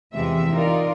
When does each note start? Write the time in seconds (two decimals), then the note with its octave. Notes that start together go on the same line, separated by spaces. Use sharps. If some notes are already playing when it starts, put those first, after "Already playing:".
0.12 E2 C3 E3 F3 G#3 E5
0.53 D#4 F4 A#4 D5